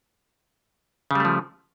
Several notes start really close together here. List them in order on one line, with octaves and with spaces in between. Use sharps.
C#3 G3 A3 F3